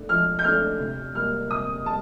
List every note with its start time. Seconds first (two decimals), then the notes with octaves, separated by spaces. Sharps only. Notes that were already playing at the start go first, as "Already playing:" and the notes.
Already playing: A3 D4
0.09 F3 F6
0.39 G6
0.44 A3 D4 F6
0.80 C3
1.15 G3 A#3 F6
1.50 C3 D#6
1.86 G3 A5